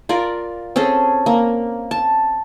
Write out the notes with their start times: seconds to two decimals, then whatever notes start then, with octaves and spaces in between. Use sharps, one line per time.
0.09 F4 A#4 D5
0.76 C4 C#4 G#4 A4
1.26 A#3
1.91 A5